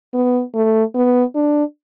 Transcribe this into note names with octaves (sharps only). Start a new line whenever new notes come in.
B3
A3
B3
D4